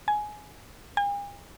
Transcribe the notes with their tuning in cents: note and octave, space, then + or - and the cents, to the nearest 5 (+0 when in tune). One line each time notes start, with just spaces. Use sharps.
G#5 +15
G#5 -45